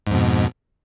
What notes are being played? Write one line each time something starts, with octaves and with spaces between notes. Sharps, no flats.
F2 G#2 B2